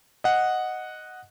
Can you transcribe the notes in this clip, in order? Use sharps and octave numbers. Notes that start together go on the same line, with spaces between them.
D#5 F#5